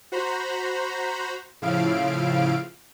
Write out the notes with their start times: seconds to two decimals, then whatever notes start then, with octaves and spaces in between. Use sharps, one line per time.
0.12 F#4 C5 A#5 B5
1.62 A2 C#3 F3 E4 F5 D7